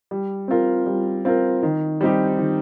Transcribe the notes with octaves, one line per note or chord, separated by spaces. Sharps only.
G3
C4 F4 A#4
G3
C4 F4 A#4
D#3
G3 C4 D#4 G4
D#3